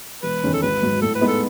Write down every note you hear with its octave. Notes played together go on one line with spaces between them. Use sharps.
E1 B4
E2 D#3 G#3 C#4
A4
G#1 B4
G#2 F#3
A2 A4
B4
G#3 B3 D#4
A4